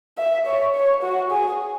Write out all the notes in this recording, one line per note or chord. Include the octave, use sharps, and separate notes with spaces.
E5
C#5
C#5
F#4
G#4